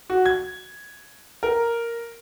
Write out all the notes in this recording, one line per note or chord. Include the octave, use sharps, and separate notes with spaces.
F#4
G#6
A#4